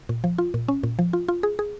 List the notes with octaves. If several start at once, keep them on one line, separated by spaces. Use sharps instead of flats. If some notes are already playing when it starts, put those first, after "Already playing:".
A#2
F3
F4
A#2
C#4
A#2
F3
F4
F4
G#4
G#4